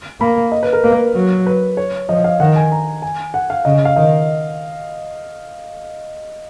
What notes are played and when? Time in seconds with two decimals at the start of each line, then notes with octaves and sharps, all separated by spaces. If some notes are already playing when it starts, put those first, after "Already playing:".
0.20 A#3 B5
0.52 D#5
0.63 B4
0.73 A#4
0.84 A#3 B4
1.15 F#3
1.46 B4
1.77 C#5
2.09 F3 D#5
2.24 F5
2.40 D#3 F#5
2.56 G#5
2.72 A#5
3.02 G#5
3.34 F#5
3.50 F5
3.65 C#3 D#5
3.85 F5
3.96 D#3 D#5